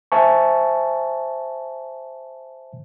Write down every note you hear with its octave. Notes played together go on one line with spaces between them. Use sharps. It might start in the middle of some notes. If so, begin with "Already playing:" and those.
C5 E5 G#5 A5 C#6